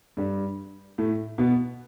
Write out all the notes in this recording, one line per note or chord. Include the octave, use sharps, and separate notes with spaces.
G2 G3
A2 A3
B2 B3